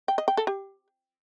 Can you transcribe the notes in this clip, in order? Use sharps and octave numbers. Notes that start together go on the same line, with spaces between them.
G5
D#5
G5
A4
G4